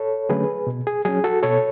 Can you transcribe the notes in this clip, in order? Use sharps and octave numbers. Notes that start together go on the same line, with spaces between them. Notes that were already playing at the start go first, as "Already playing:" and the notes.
Already playing: A4 C#5
D3 F#3 A3 C#4 G#4 B4
B2
G#4
F#3 C#4 G#4
F#4 A4
B2 A4 C#5